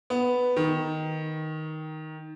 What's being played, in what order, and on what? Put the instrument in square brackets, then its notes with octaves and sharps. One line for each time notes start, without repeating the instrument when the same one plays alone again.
[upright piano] B3
D#3